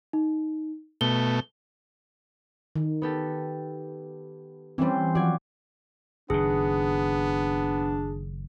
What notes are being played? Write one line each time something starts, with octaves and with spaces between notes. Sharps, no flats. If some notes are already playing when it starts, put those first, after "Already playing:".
D#4
B2 A3 G7
D#3
B3 G4 A4
E3 G3 C4 C#4 C5
F3 F#3 F#4 D5 G#6
F#1 D#3 B3 D4 G#4